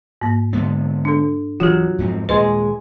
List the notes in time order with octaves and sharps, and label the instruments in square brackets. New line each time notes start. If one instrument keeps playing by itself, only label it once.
[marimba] G#2 A#3
[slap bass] D3 G#3 B3
[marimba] D4 A4
[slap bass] D2 E3 [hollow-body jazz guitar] F#3 [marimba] F4 G4
[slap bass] F2 G#2 C4
[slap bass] D#2 A#2 [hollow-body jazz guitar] G#3 G#4 [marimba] B4 D#5 C6